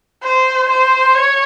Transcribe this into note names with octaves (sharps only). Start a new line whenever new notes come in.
C5
C5
C#5